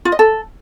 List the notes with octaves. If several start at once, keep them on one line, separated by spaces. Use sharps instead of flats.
F4
D#5
A4